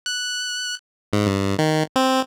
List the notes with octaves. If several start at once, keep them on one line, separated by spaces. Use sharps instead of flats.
F#6
G#2
G2
D#3
C4